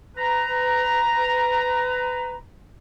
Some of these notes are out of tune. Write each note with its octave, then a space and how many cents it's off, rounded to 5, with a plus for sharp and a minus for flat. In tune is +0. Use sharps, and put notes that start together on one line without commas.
B4 +25 A#5 +0